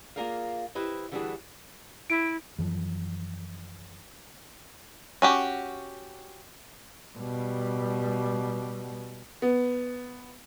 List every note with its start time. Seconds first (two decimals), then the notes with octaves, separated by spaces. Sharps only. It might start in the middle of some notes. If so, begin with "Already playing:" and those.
0.16 A#3 F4 G#4 A#4 D5 F5
0.75 E4 G4 B4 C5 D#5
1.12 D3 E3 G3 D4 F#4 G#4
2.10 E4 D7
2.59 F#2 E3 F3
5.22 C#4 F#4 G4
7.18 B2 G3
9.42 B3